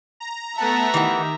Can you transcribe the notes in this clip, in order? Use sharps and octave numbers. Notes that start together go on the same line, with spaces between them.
A#5
A3 B3 E5 F#5 A5 A#5
D#3 E3 D#4 G4 F#5